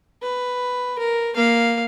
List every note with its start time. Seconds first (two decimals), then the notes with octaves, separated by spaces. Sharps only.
0.22 B4
0.98 A#4
1.35 A#3 F5